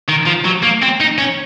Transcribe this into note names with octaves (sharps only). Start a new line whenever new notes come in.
D#3
F3
F#3
A#3
C4
D#4
C#4